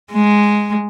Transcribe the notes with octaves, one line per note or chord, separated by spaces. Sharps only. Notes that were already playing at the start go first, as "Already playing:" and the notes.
G#3